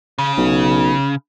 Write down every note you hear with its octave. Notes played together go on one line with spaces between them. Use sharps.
C#3
B1